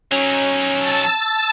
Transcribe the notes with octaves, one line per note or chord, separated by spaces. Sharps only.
F#3 C#4 D#4
A5 E6 A6